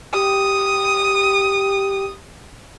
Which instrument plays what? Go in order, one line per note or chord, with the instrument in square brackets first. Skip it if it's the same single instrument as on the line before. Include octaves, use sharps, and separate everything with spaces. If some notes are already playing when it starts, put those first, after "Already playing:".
[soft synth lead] G4 [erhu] D#6